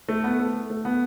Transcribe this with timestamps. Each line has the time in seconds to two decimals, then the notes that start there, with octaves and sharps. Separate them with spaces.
0.09 A3
0.24 B3
0.39 A3
0.70 A3
0.85 B3